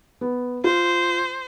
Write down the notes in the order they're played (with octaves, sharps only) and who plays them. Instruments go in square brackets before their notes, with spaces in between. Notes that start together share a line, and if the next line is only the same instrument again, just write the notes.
[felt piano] B3
[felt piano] F4 [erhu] C5